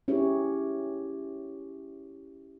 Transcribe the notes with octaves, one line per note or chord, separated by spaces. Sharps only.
C#4 E4 G4 G#4 C#5